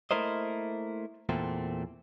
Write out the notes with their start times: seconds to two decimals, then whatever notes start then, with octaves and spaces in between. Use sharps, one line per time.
0.11 A3 A#3 E4 A#4 C5 D#5
1.29 E2 A#2 A3 C4